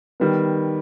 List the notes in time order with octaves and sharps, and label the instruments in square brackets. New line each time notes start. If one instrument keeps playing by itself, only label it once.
[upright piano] D#3 G3 B3